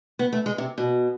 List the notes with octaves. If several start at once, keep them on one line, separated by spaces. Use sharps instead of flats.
B3
A3
G#3
C3
B2